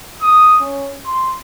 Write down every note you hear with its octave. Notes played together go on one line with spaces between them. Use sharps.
D#6
C#4
C6